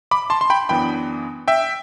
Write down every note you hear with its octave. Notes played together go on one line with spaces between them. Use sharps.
B5 D6
A5 C6
C6
G5 B5
F#2 E3 B3 D4 G5 B5
E5 G5